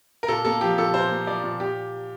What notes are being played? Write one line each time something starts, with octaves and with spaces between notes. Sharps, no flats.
A#4
A#2 A4
A#3 A4
F3 G4
A#2 A4
A#2 C5
A#3
F3 D5
A#2
A#2 G4